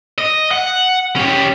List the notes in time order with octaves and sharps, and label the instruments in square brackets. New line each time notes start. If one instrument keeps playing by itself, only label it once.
[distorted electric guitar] D#5
F#5
C#4 G4